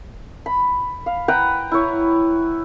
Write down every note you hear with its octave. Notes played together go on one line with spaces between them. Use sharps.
B5
F5
B4 F#5 G5 A#5
E4 C#5